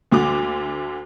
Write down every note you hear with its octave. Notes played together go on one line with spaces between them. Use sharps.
D2 D3 F#4 D6